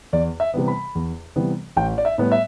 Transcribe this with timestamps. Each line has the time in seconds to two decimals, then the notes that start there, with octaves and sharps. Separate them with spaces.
0.13 E2 D5
0.40 E5
0.54 C3 E3 G3 B3
0.68 B5
0.95 E2
1.36 C3 E3 G3 B3
1.77 A1 G5
1.98 D5
2.05 E5
2.18 A2 G3 B3
2.32 E5